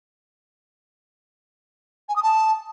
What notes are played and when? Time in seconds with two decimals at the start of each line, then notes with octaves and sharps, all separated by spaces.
2.09 G#5
2.16 D#6
2.23 A5